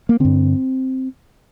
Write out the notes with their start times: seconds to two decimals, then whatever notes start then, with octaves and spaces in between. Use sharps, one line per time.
0.09 A#3
0.20 G2 D3 C4